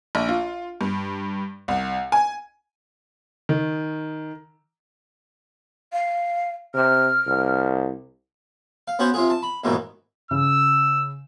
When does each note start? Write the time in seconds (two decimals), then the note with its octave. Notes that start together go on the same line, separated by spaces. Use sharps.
0.15 A#1
0.29 F4
0.81 G2
1.68 C2
2.12 G#5
3.49 D#3
5.92 F5
6.74 C3 F6
7.27 C2
8.88 F5
8.99 B3 C#4 F#4 C5 C#5
9.14 C3 F4 G#4
9.30 A5
9.43 B5
9.64 D#2 G#2 B2 D#3 E3
10.31 C#3 E6